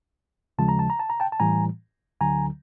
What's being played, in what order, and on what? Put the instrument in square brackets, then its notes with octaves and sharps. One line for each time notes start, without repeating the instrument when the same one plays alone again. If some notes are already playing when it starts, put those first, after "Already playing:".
[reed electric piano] D#2 C#3 F3 G#3 A5
A#5
A5
A#5
A5
A#5
G5 A5
A5
A2 E3 G3 G#5 A#5
D2 D3 F#3 G#5 A#5